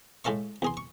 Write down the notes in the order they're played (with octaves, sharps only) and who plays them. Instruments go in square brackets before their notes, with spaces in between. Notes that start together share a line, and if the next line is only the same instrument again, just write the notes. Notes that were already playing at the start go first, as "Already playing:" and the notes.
[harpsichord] A2 G#3 A4 F5 C#6
E2 G#4 C6
C#6